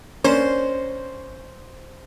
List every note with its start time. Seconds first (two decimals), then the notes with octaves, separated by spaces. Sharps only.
0.24 A#3 C#4 D4 C5